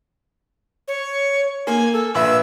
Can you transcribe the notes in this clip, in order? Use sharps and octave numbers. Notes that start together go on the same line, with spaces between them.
C#5
A#3 G#5
A4
A#1 B4 E5 E6